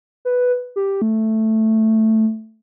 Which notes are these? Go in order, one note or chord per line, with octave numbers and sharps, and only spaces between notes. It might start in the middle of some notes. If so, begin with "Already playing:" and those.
B4
G4
A3